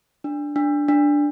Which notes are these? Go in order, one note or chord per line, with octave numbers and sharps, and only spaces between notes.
D4
D4
D4